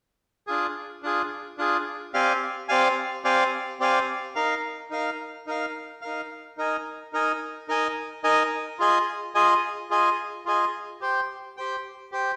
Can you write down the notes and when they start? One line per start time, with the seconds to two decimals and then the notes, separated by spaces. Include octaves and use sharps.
0.47 D4 F4 G#4
1.03 D4 F4 G#4
1.58 D4 F4 G#4
2.14 C4 G4 D5 F5 G#5
2.68 C4 G4 D5 F5 G#5
3.24 C4 G4 D5 F5 G#5
3.80 C4 G4 D5 F5 G#5
4.35 D#4 A#4 F5
4.91 D#4 A#4 F5
5.47 D#4 A#4 F5
6.01 D#4 A#4 F5
6.57 D#4 A#4 D#5 G#5
7.13 D#4 A#4 D#5 G#5
7.68 D#4 A#4 D#5 G#5
8.24 D#4 A#4 D#5 G#5
8.79 F4 G#4 D#5 G#5
9.35 F4 G#4 D#5 G#5
9.90 F4 G#4 D#5 G#5
10.46 F4 G#4 D#5 G#5
11.01 G4 C5 G5
11.57 G4 C5 G5
12.12 G4 C5 G5